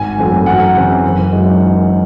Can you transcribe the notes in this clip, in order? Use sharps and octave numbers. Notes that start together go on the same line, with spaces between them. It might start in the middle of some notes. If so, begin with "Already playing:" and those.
Already playing: G#1 G#5
F#2 E3 A3 C4
F#2 F#5
C#3 E3 C4
F#1
F#2 E3 G#3 D#4